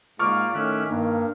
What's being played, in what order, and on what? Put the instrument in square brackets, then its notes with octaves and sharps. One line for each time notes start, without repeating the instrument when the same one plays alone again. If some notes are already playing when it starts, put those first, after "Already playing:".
[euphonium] G#2 [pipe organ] A#3 D5 [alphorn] F4 [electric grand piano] C#6 D6 F6
[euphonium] A2 [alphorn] D#3 [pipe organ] C#4 E5 F#6
[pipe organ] G2 [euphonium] A#3